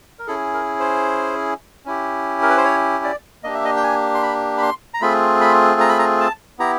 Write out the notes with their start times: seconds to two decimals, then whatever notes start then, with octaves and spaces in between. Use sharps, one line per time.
0.19 A#4
0.27 C#4 E4 G#4 A4
0.54 A#4
0.80 C5
1.85 C#4 E4 G4
2.42 A#4
2.50 B4
2.57 C5
2.64 C#5
3.04 D5
3.43 A#3 D4 G4 D#5
3.54 E5
3.65 D#5
3.76 G5
3.83 G#5
4.14 C6
4.23 B5
4.57 B5
4.62 C6
4.94 A#5
5.01 A3 C4 F4 G#4 B5
5.41 B5
5.81 A#5
5.89 B5
5.99 A#5
6.20 A5
6.59 B3 E4 G4 A#5